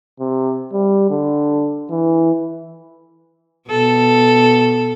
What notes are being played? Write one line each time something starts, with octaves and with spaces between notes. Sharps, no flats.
C3
G3
D3
E3
B2 A4